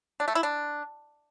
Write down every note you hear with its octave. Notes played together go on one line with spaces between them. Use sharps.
D4
A3
E4
D4